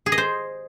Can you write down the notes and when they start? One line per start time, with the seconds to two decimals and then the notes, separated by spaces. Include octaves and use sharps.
0.06 G#4
0.12 D#5
0.18 C5